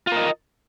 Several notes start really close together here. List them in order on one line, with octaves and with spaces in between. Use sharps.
F4 A#4 D#5